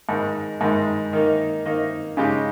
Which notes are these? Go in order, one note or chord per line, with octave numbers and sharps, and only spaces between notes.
G#2 D#3 G#3
G#2 D#3 G#3
D#3 A#3 D#4
D#3 A#3 D#4
C#3 G#3 D#4 G4